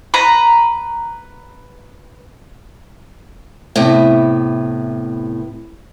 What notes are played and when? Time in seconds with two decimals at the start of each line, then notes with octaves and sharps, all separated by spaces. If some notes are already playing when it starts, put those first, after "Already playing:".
0.14 B4 A#5
3.76 A2 C3 B3